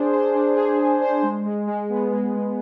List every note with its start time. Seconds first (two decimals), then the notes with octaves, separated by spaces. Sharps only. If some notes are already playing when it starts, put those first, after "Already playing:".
Already playing: D4 G#4 C5
0.13 C5
0.34 D4
0.56 G#4
0.79 G#4
1.01 C5
1.23 G#3
1.46 G#3
1.67 G#3
1.89 B3
2.12 G#3
2.34 G#3